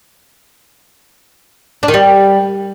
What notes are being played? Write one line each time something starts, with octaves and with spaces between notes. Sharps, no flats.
D4
D#3
G3